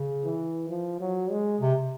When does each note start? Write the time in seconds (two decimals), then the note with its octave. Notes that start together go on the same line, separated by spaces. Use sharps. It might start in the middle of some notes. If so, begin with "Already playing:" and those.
Already playing: C#3
0.25 E3
0.70 F3
1.01 F#3
1.31 G#3
1.61 C3